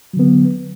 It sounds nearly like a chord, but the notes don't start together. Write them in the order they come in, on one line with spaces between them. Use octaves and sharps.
F#3 D3 B3